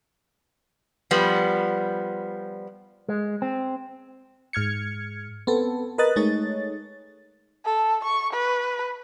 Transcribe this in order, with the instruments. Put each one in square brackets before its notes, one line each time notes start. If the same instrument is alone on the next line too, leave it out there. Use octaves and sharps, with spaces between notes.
[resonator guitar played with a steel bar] F3 G3 B3
[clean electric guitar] G#3
C4
[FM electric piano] G#2 F6 G#6 C#7
B3 C4 A4
A#4 B4 D#5 F#6 A6
G#3 A3 D#4 C#5 A6
[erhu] A4
C#6
B4